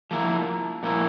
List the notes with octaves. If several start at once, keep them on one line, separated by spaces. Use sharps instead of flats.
F3 A#3 E4
A#2 F3 A#3 E4